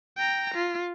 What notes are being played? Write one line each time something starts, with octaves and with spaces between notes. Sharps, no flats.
G5 A#5
F4